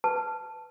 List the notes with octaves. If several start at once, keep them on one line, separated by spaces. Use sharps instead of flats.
B4 A5